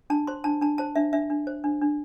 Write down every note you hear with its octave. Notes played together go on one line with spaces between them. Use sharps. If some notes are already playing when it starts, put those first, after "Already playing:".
D4 A5
C5 C6
D4 A5
D4 A5
C5 A5
D4 E5
D4 E5
D4
C5
D4
D4